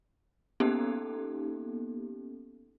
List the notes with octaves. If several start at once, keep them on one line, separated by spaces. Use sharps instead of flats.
A#3 B3 C#4 D#4 G4 A4